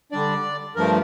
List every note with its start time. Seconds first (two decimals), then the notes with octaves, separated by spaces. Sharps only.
0.12 D3 G3 D4 D5
0.76 G2 F3 A3 A#4